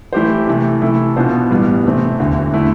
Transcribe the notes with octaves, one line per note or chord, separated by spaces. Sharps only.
E3 A3 E4 G4 C5
C3 E3 A3
C3 E3 A3 E4 A4
B2 B3 D4 F4 C5
A1 G2 E3 G3 B3
C3 E3 A3 C4
E1 D2 D3
D3 A3 E4